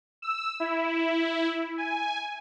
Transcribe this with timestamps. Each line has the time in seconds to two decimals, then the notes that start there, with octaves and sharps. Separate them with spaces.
0.22 E6
0.60 E4
1.78 G#5